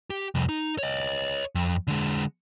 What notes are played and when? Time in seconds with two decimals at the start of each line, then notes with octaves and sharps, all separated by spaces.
0.10 G4
0.35 C2 F2
0.49 D#4
0.78 C#5 D#5
1.55 F2
1.88 D3 G#3